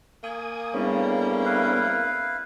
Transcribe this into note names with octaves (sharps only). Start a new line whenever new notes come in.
A#3 G#5 D#6
A2 C#3 G3 B3 C4 D4
E4 B4 F5